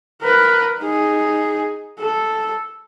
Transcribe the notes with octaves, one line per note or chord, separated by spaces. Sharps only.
A#4 B4
D#4 G#4
A4